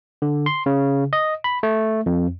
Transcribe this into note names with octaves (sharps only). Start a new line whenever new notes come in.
D3
C6
C#3
D#5
B5
A3
F2